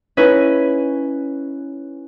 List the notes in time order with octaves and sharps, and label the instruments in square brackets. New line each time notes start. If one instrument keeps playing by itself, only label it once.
[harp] C#4 D#4 E4 B4